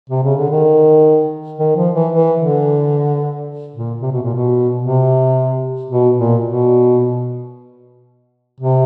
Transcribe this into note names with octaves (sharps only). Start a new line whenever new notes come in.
C3
C#3
D3
D#3
D#3
F3
E3
E3
D3
A#2
C3
B2
A#2
B2
C3
B2
A#2
B2
C3